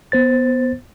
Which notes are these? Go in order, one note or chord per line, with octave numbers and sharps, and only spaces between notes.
B3 C5 A6